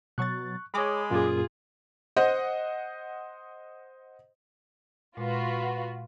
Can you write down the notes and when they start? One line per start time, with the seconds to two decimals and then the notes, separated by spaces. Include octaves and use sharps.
0.18 B2 F#3 C#6 F#6 A6
0.74 G#3 G#4 C#5 B5 D6 D#6
1.10 F#2 A#2 A#3 F4 G#4
2.16 C5 D#5 F#5
5.17 A#2 G#3 F4 F#4 B4